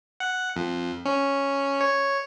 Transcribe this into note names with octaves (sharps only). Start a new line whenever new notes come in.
F#5
F2
C#4
C#5